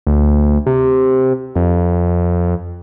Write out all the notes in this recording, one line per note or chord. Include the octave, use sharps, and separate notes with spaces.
D2
C3
F2